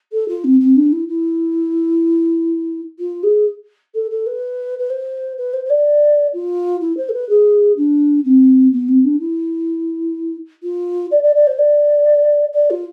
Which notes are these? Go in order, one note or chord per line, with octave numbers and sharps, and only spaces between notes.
A4
F4
C4
C4
D4
E4
E4
F4
G#4
A4
A4
B4
B4
C5
B4
C5
C5
D5
F4
E4
C5
A4
B4
G#4
D4
C4
B3
C4
D4
E4
F4
D5
D5
D5
C5
D5
D5
F4